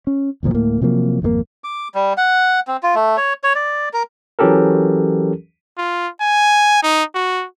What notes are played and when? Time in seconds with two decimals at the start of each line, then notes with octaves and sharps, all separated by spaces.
0.07 C#4
0.43 G1 D2 A#2 F3
0.54 D1 A2 A#3
0.82 C3 F3 F#3 A#3
1.21 G#1 F2 D3 A#3
1.64 D6
1.95 G3
2.17 F#5
2.68 C4
2.83 F4
2.95 A3
3.17 C#5
3.44 C#5
3.55 D5
3.93 A#4
4.39 E3 F#3 C#4 G4 A4 A#4
5.77 F4
6.21 G#5
6.83 D#4
7.15 F#4